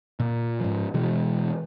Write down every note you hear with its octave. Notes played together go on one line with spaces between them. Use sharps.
A#2
G#2 F3
B2 E3 G#3